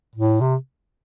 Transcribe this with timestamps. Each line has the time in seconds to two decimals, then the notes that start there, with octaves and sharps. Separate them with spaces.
0.15 A2
0.41 C3